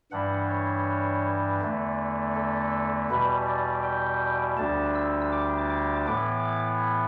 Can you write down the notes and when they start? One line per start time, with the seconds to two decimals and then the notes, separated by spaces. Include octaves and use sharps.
0.11 G2 E3 G3 D4 F#5
0.49 C#5
1.60 E2 D3 A3
2.35 A4
3.09 E2 B2 G3 B4
3.47 D5
3.84 G5
4.57 D2 D3 G3 D4 A5
4.95 E6
5.32 D6
5.70 D6
6.07 A2 E3 B3 D6